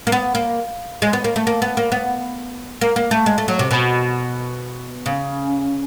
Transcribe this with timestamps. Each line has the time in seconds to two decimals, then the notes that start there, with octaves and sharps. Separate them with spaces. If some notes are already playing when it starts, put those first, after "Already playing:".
0.07 A#3
0.12 B3
0.35 A#3
1.02 G#3
1.13 B3
1.24 A#3
1.36 A3
1.47 A#3
1.62 B3
1.77 A#3
1.92 B3
2.81 A#3
2.96 A#3
3.11 A3
3.26 G#3
3.38 A3
3.48 F#3
3.59 C3
3.71 B2
5.06 C#3